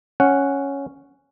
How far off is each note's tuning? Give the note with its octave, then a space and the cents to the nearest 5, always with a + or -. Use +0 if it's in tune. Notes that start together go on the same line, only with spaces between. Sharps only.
C#4 +0 F#5 +0